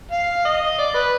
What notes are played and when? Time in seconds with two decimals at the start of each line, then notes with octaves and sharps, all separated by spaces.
0.11 F5
0.45 D#5
0.78 D5
0.94 B4